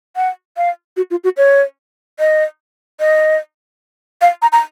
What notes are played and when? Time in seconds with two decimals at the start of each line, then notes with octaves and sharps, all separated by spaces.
0.16 F#5
0.57 F5
0.97 F#4
1.11 F4
1.24 F#4
1.37 C#5
2.19 D#5
3.00 D#5
4.21 F5
4.42 A#5
4.52 A#5